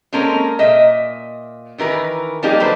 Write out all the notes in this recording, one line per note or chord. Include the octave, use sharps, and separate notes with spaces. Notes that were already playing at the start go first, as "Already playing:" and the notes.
G#3 A#3 C4 C#4 A4 A#4
A#2 D#5 E5
D#3 E3 A#4 B4
F3 G3 A#3 D#4 G4 G#4
D3 F#3 A4 B4 C5